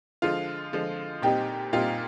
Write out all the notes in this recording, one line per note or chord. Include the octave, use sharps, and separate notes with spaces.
D3 F3 G#3 F4
D3 F3 G#3
A#2 G3 C4 D#4 G4
A#2 G3 C4 D#4 F4